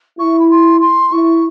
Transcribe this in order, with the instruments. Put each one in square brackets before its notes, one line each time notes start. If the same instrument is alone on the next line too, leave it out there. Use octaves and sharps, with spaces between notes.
[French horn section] E4 [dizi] C#6
[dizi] B5
C6
C6
[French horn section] E4 [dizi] C#6